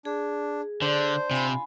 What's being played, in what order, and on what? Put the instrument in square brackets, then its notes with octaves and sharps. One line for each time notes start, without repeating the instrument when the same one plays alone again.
[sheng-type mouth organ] D4 [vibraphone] G#4
[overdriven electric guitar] D3 [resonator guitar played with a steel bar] D4 [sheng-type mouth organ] C5
[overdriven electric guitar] C3 [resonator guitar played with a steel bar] F4 [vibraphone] G#5 B5